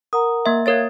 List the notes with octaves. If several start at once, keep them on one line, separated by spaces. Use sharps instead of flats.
A#4 F#5 A#5 D#6
A#3 E5
A#4 C#5 E5 F5 G#6 A6